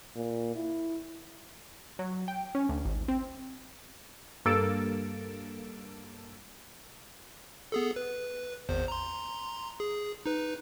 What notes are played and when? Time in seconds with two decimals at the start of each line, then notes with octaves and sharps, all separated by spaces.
0.16 A#2
0.55 E4
1.99 F#3
2.28 G5
2.55 C#4
2.69 D2
2.85 G#1
3.08 C4
4.45 G2 A#3 A4 E6 A6 D7
7.72 B3 G#4 A4
7.96 B4
8.69 G#1 E2 C5
8.88 A#5 C6
9.80 G#4
10.26 D#4 B4